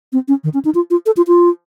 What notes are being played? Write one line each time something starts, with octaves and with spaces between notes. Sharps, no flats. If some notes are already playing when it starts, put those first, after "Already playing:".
C4
C#4
D#3
C#4
D#4
F4
F4
A4
F4
F4